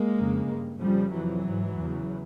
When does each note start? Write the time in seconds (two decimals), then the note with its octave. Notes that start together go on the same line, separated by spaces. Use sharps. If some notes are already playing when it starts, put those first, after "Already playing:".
Already playing: G#3 A#3
0.15 F2 C#3
0.47 G2
0.80 F2 C#3 F3 G3
1.13 F2 C3 E3 F#3
1.45 G#2
1.78 E2 C#3